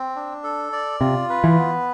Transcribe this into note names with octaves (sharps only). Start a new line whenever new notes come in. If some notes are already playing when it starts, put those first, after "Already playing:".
Already playing: C4
D4
A4
D5
C3 F4
B4
E3
B3